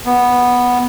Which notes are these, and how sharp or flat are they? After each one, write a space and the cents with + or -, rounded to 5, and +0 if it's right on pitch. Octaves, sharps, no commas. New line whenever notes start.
B3 -5